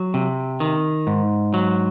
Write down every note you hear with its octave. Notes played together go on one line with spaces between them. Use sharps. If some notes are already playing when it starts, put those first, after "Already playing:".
Already playing: F#3
C3
D#3
G#2
F#3